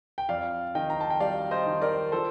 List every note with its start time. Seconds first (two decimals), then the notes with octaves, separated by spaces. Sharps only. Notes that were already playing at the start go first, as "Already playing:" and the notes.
0.18 G5
0.29 F2 D5 F5
0.75 D#3 D#5 G5
0.90 A#5
1.01 A5
1.10 G5
1.20 G3 D5 F5
1.51 C5 D#5
1.66 D#3
1.82 A#4 D5
2.12 F3 A4 C5